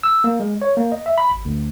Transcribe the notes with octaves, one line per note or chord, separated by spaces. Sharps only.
E6
A#3
G#3
C#5
A#3
D#5
E5
B5
G#1
D2